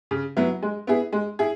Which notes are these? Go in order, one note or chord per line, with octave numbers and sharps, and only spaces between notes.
C#3
F#3 B3 E4
G#3
B3 E4 G#4
G#3
E4 G#4